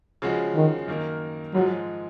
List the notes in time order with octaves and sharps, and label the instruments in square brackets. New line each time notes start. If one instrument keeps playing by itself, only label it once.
[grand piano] C#3 F3 G#3 C#4 F#4
[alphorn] D#3
[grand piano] F#2 D#3 A#3 D#4 A#4
[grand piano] G#2 F3 G#3 [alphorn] F#3